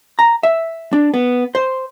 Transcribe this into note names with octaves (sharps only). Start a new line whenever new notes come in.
A#5
E5
D4
B3
C5